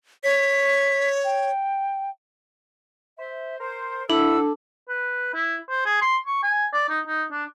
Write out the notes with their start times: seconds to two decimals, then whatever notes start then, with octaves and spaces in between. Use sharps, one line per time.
0.24 C#5 B6
1.24 G5
3.19 C5 E5
3.59 A#4 C5
4.10 D2 D4 E4 A4 F#5 E6
4.89 B4
5.34 E4
5.70 C5
5.86 G#4
6.02 C6
6.26 C#6
6.43 G#5
6.73 D5
6.89 D#4
7.07 D#4
7.32 D4